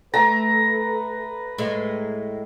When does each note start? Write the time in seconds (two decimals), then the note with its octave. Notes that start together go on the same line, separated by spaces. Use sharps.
0.14 A3 B4 A#5
1.58 A2 G#3